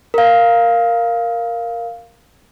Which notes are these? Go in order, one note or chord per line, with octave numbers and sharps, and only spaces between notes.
A#4 F5